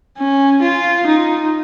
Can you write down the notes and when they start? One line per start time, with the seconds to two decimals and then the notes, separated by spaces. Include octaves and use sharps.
0.17 C#4
0.62 F4
1.07 D#4